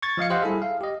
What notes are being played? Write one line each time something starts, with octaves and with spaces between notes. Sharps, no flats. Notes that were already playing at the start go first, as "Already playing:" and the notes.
C#6 G#6 A6
F3 D#5 F5 C#7
G4 C5 D#5 F5 F#5
G3 E4 G#4 A4 E5
F5
G4 D#5